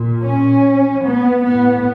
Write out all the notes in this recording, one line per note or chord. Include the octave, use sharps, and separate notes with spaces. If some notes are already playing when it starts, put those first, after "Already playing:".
Already playing: A#2
C#4
B3
A2 B3